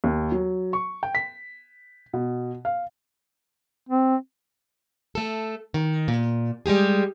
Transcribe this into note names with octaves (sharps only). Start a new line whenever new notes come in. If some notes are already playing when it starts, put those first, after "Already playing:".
D#2
F#3
C#6
G5
B6
B2
F5
C4
A3 A4
D#3
A#2
G3 G#3 G4 G#4